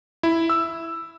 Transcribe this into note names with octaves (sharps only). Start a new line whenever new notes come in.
E4
E6